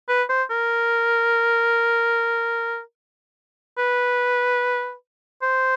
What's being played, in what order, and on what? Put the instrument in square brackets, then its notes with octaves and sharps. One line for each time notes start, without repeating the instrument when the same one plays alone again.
[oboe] B4
C5
A#4
B4
C5